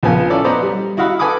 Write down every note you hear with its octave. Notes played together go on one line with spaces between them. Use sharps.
A#1 C#3 F3 B3 A#4 G#5
C#4 E4 A4 D5
B3 B4 C5 D5 D#5 A#5
G3
E4 F#4 D#5 F5 F#5 B5
A4 B4 G#5 B5 D6 D#6